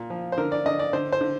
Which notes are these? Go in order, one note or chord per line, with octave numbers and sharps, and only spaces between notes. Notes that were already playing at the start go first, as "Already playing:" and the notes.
Already playing: A#2
F3
C5
D3 A#4
D5
D3 D#5
D5
D3 C5
C5
D3